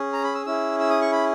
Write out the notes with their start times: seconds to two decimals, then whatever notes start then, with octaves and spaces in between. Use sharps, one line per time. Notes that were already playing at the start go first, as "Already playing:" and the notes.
Already playing: C#4 G#4
0.13 A#5
0.24 B5
0.35 E6
0.46 C#4 E4 G#4 E6
0.79 E6
0.90 D#6
1.01 C#6
1.12 B5